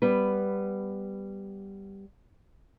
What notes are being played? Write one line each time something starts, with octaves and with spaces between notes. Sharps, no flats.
G3 B3 B4